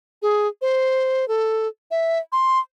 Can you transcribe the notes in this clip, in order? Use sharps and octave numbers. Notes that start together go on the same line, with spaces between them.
G#4
C5
A4
E5
C6